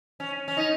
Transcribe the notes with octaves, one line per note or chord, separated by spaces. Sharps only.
C#4
C#4
D#4